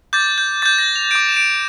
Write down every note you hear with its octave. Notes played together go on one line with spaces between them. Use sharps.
D6 G6 A6
G6
D6 G6 A6
A#6
F7
D6 G6 D7
E7
D7